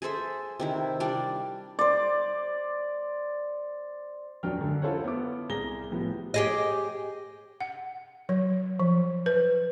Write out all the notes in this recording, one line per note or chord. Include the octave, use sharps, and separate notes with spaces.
G#4 A4 C5 E5
C3 D#3 E4
G3 D4 D5
C5 D5
D#1 F2 F#3 D4 G5 F6
F#2 D3
E4 F4 A4 C5 C#5 F#5
B3 D6
C2 G#4 A#5 A#6 G7
A2 F3 B3 G4
G4 G#4 D#5
F#5
F#3
F3
B4